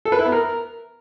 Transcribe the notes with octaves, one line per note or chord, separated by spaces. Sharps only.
A4
B4
E4
B3
A#4